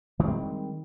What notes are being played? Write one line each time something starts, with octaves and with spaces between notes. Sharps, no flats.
D#3 G3 G#3 C4